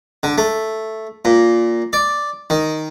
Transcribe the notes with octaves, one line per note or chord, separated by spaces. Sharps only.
D3
A3
A#2
D5
D#3